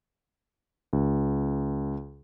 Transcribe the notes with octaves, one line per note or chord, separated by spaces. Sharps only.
C#2